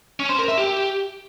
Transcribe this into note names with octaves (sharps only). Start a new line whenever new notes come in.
C#4
C5
A#4
E5
G4